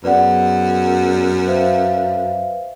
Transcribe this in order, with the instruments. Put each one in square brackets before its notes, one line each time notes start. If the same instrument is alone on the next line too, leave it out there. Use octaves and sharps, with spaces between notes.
[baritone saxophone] F#2 [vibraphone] B3 G#4 [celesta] B4 D5 F#5
[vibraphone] B4 E5 F5 [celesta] C5